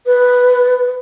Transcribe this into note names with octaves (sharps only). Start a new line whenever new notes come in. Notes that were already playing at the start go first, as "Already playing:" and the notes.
B4